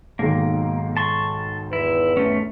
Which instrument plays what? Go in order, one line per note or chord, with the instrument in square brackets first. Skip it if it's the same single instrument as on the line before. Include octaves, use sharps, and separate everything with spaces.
[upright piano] B1 G#2 D#3 [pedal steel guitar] A#3
[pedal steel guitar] A5 C6 C#6
[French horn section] E2 B4 [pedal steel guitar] E4
[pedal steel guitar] A3 C#4